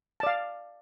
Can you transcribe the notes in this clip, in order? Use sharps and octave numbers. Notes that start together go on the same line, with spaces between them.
D5 F5 A5